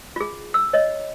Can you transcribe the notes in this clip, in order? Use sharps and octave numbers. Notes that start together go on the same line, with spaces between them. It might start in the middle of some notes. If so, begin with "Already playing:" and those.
F4 G#4
E6
C#5 D#5